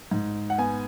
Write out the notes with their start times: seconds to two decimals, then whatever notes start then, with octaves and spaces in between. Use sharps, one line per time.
0.11 G#2
0.50 F#5
0.58 B3 G#5